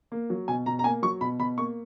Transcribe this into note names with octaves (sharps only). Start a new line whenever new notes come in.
A#3
F#3
B2 G#5
B2 A#5
A#5
A#3 G#5
F#3 C#6
B2 B5
B2 B5
A#3 C#6